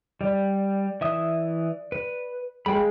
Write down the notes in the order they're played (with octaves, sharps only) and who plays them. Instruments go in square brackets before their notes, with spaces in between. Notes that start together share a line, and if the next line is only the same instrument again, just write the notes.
[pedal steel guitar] G3 [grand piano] D5
[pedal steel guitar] E3 E5 D#6
B4
[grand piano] G#3 G#4 [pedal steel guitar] F5 G5 B5